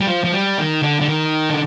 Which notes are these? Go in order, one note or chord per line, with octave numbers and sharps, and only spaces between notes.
G3
F3
F3
G3
D#3
D3
D3
D#3
D3